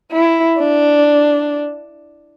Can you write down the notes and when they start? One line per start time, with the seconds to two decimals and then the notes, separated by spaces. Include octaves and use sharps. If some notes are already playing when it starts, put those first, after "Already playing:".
0.12 E4
0.59 D4